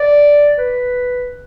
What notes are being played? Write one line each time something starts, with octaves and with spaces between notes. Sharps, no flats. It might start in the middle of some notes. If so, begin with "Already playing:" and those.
Already playing: D5
B4